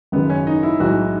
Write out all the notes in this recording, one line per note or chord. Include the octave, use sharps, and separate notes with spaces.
G#1 F#2 C#3 G#3 B3
C#4
D#4
E4
B1 A2 E3 G#3 F#4